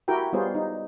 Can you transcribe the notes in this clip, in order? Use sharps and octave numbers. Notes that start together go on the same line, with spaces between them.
E4 F#4 G4 A#4 G5
G3 B3 F4 G#4 C5 C#5
D#4